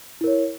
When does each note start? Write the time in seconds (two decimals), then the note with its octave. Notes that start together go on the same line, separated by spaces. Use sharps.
0.21 E4
0.24 A#4
0.27 C#5